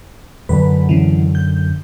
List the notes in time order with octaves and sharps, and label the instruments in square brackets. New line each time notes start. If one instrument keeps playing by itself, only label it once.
[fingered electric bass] F#2 D3 F#3 [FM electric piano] B4
[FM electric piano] C#3 E3
G6